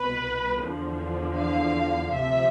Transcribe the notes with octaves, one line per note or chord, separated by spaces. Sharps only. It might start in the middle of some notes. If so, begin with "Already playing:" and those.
Already playing: C2 B2 B4
E2 D3 F3
F5
D2 C3 F3 E5